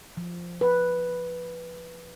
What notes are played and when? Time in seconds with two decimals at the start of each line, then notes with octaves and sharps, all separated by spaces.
0.17 F3
0.61 B4